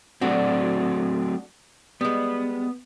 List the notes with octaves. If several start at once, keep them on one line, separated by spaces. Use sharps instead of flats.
F#3 A3 C4 D4 F#4
G3 G#3 B3